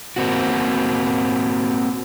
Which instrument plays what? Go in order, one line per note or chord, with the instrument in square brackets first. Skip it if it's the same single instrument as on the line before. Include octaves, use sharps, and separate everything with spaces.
[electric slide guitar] A#3 C4 F#4